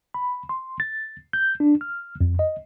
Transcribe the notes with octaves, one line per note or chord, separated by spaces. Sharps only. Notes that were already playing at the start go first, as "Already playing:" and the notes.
B5
C6
A6
G6
D4
F6
F2
D#5